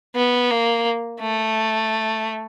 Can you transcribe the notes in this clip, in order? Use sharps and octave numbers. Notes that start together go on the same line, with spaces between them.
B3
A#3
A3